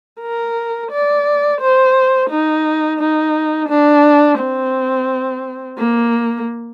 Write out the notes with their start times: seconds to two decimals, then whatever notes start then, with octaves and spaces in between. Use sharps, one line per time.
0.21 A#4
0.91 D5
1.61 C5
2.30 D#4
2.99 D#4
3.69 D4
4.39 C4
5.78 A#3